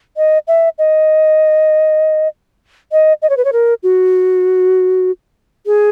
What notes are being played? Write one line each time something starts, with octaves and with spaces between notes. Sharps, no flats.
D#5
E5
D#5
D#5
D#5
C#5
B4
C#5
A#4
F#4
G#4